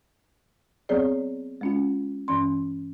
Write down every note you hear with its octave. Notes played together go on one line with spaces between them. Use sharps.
F#3 B3 C4 G#4 C#5 D5
G#3 C#4 F4
G2 E3 C#4 C6